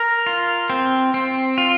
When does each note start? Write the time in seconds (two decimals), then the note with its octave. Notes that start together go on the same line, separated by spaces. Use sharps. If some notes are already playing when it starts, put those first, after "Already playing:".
Already playing: A#4
0.26 F4
0.70 C4
1.14 C4
1.58 F4